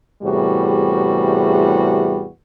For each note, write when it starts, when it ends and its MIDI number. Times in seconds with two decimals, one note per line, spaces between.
0.23 2.26 40
0.23 2.26 45
0.23 2.26 48
0.23 2.26 55
0.23 2.26 66
0.23 2.26 68